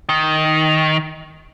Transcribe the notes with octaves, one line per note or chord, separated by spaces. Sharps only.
D#3